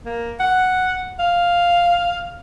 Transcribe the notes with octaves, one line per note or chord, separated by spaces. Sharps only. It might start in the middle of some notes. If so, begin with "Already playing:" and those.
A#3
F#5
F5